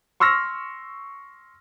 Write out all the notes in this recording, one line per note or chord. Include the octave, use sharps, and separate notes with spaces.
C6 C#6 E6 F6 A#6